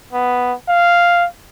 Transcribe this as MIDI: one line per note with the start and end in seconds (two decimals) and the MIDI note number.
0.13 0.54 59
0.69 1.27 77